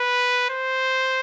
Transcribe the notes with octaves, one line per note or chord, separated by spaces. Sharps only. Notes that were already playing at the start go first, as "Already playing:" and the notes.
Already playing: B4
C5